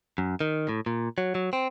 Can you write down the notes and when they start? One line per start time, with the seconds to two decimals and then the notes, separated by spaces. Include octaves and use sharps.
0.18 F#2
0.41 D#3
0.69 A2
0.86 A#2
1.18 F#3
1.35 F#3
1.53 C4